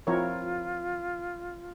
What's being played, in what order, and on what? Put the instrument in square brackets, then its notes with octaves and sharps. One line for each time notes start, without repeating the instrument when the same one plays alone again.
[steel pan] F3 C4 E4 A#4 C#5 [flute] F4